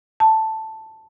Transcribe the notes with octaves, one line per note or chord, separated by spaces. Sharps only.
A5